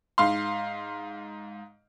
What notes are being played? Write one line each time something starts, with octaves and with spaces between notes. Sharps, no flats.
G#2 F5 C6